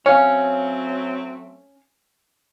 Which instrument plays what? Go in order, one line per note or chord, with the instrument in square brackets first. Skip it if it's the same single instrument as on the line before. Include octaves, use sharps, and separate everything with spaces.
[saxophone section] F#3 A3 C4 [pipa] C#4 [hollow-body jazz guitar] C#5 F5